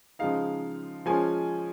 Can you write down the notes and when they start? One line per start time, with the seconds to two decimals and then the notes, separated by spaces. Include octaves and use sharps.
0.19 C#3 F3 G#3 D#4 F5
1.06 F3 G#3 C#4 F4 G#5